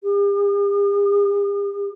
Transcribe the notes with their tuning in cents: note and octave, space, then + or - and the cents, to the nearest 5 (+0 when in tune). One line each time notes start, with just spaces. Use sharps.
G4 +45